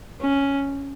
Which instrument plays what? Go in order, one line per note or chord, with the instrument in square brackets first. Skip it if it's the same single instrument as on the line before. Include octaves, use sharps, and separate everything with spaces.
[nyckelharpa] C#4